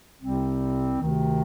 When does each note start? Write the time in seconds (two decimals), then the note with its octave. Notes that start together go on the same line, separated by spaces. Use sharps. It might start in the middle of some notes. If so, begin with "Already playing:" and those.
0.21 C2 C3 G3 C4
1.01 D2 C3 D#3